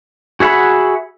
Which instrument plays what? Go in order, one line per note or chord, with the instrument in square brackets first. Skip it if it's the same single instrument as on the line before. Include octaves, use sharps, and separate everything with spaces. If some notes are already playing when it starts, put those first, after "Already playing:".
[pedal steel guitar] F#4 G#4 E5 F#5 B5